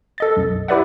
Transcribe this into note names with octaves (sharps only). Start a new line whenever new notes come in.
A4 D#5 A6
B1 F#2
E4 G4 B4 D5 E5 F#5